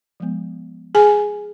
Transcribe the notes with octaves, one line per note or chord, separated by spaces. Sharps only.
F3 G#3 B3
G#4 G#5